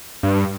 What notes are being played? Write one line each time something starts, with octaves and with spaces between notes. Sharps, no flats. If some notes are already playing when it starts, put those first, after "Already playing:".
G2